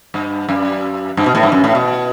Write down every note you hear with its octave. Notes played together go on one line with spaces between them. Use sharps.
G2
F#2
G2
B2
A2
G2
F#2
A2
B2